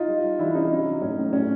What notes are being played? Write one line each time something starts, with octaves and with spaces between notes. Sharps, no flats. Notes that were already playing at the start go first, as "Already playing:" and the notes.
Already playing: D#4 F4
G3
G3
E3 D4 E4
C3 C#4 D#4
F#3
F#3
A2 C#4
A2
F#3 C#4